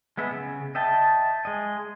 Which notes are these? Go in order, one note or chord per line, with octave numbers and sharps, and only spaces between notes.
G#3 B3 E5
C#3
D#5 E5 G5 A5
G#3 D#5